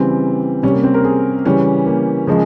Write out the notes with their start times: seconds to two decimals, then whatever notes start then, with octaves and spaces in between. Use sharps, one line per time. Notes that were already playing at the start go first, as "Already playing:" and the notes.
Already playing: C#3 E3 G3 C4
0.63 C3 G3 C#4
0.73 A#3
0.84 C4
0.94 A#4
1.04 G#4
1.45 C#3 E3 G3 C#4
1.86 A#3
2.27 C#3 F3 G#3